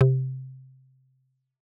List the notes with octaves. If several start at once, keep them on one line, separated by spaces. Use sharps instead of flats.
C3